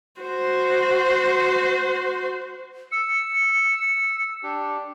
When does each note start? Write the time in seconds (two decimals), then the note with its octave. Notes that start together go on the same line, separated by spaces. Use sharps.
0.21 F#4 C5
2.92 E6 C#7
4.43 D4 G4